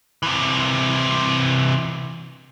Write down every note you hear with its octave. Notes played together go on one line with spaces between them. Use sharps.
C3 E3